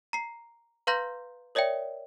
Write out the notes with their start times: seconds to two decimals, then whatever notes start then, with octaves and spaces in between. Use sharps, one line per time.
0.13 A#5 C7
0.87 B4 F5 A#5 C6 G6 A#6
1.55 A#4 C#5 D5 E5 G5